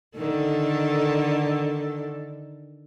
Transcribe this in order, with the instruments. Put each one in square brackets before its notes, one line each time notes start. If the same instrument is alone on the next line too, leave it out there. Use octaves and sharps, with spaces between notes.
[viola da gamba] D3 D#3 A4